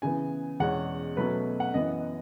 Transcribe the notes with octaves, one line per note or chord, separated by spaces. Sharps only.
C#3 E3 B3 G#5
E2 B2 G#3 C#4 F#5
B2 F#3 A3 C#4 B4
F#5
F#2 E3 B3 D#5